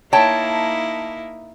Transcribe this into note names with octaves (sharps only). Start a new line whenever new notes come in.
A#3 D#4 E4 C#5 G5 A5